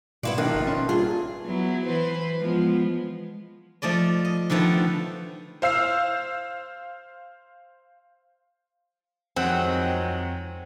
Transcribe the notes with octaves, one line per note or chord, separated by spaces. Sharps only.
B2 B3 C4 E4 D5 F5 G5
A#1 D#3 A3 F4 A5 D#6 F#6
G1 B4 F5 C6
C#4 C6
G2 A#2 F#3 F4 G#4 A4
F#3 B3 E4
E3 B4 C5
F3 G#3 B3
F3 A3 D5 D#5
D#5
D3 D#3 F3 A3 B3
C5 F5 E6 C7
F2 D#3 F#3 G#3 C4 F#5 G5